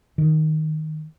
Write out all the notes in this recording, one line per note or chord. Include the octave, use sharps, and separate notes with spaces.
D#3